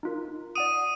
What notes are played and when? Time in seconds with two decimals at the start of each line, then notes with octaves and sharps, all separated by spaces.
0.03 D#4 F4 A#4
0.55 D5 F#5 D#6 D7 D#7